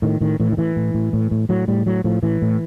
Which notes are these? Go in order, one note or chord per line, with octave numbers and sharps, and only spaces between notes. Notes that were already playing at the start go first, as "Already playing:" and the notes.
A2 D#3
A2 D#3
A2 E3
D#3
A2 E3
A2
A2
A2
A2
A2 F#3
A2 G3
A2 F#3
A2 F3
A2 E3
A2